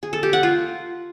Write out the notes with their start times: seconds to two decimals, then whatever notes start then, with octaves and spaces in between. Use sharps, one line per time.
0.03 G#4
0.13 A4
0.23 G4
0.33 F#5
0.43 F4